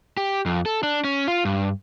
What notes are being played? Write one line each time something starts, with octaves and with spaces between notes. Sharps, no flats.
G4
F2
A4
D4
C#4
F4
G2